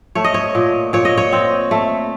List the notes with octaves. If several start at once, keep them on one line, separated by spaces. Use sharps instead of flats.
A3 C#5
D#5
C#5
A#2
A#2 C#5
D#5
C#5
C4
A3